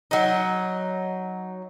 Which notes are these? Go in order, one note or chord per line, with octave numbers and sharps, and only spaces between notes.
F#3 D#4